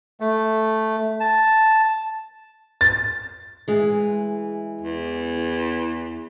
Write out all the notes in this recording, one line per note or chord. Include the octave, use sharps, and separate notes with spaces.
A3
A5
A6
E3 G#3
E2